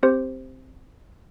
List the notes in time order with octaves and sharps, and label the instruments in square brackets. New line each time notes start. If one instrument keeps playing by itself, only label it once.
[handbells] C4 G4 C5